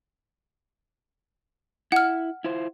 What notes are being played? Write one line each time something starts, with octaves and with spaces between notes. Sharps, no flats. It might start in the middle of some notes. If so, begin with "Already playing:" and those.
E4 F#5 F6
E4 F4 C5